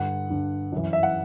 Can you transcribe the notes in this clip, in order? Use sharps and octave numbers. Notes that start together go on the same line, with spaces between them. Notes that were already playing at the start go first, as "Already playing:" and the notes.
Already playing: G2 D3 F#5
G2 D3
F#2 E3
E5
F#5